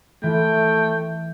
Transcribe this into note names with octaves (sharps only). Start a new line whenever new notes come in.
E3 A3 F4 G5